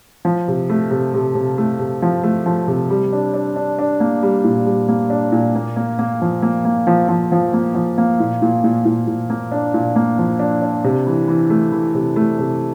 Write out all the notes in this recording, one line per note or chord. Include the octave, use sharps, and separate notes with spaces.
F3
C3
A3
C3
C3
C3
A3
C3
F3
A3
F3
C3
G3
D4
D4
D4
D4
A#3
G3
A#2
G3
A#3
D4
A#2
A#3
A#3
A#3
F3
A#3
A#3
F3
F3
F3
A#3
F3
A#3
A#2
A#2
A#2
A#2
A#2
A#3
D4
A#2
A#3
F3
D4
D4
C3
E3
E3
A3
E3
C3
A3
C3